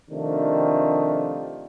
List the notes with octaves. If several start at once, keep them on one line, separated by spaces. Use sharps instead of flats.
C3 D#3 F3 A3 D4